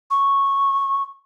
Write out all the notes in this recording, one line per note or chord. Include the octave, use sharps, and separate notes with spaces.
C#6